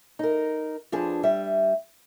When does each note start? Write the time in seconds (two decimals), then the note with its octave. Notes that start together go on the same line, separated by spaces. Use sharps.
0.19 D#4 A#4
0.92 F2 F3 D4 G#4 B4
1.23 G3 E5